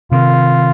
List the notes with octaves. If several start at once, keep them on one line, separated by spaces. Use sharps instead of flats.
C3 D#3 F4